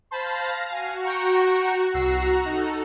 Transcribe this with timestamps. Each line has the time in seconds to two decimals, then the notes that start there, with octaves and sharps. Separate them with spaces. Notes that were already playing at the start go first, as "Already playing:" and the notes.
0.11 C5 F5 A5 B5 A#6
0.69 F#4 F5 G#5
1.03 G5 A#5 C#6
1.94 C2 F#4 A#5 E6 C7
2.45 D#4 A4